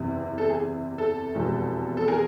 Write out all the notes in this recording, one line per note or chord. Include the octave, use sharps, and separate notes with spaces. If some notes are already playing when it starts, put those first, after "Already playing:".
Already playing: F#1 E2 C3
A4
G#4
A4
F1 E2 B2 G#3
A4
G#4 A#4